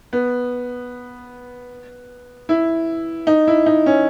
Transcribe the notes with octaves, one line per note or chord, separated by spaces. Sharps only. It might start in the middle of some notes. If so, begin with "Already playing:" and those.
B3
E4
D#4
E4
D#4
C#4